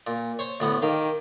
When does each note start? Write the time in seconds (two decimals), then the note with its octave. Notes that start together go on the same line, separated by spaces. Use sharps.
0.07 A#2
0.39 C5 C#5
0.60 D2 A2 B3
0.82 D#3 G4 F5